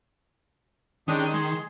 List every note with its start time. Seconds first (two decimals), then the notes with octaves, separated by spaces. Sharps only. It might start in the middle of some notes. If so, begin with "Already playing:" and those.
1.08 D#3 G#3 C#4 D4 G4 G5 D#6
1.34 G#3 G#4 C6